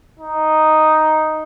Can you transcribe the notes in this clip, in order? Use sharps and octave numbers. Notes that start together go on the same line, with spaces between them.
D#4